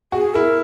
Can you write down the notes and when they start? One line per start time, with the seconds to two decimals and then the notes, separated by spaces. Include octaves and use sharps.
0.12 F#4 G#4
0.35 E4 A#4